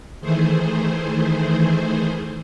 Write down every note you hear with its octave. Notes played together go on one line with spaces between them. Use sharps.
D#3 E3 A3 G#4 C5